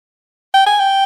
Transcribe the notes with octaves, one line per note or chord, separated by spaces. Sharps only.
G5
G#5
G5